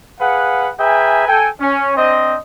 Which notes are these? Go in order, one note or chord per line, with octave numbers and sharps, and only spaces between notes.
G#4 B4 F5 F#5
G#4 B4 E5 G5 G#5 A#5
A4 G5 G#5
C#4
C4 D4 C5 D#5